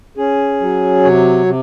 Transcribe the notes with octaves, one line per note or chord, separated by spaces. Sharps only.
C#4 G#4
F#3
C3 C#5
C3